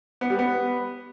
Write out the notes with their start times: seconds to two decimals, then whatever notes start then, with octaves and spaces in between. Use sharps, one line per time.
0.21 B3
0.30 G3
0.39 B3